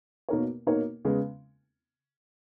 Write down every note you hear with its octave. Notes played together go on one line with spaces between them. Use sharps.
B2 A#3 D#4 A#4 C#5
B2 A#3 D#4 A#4 C#5
C#3 G#3 B3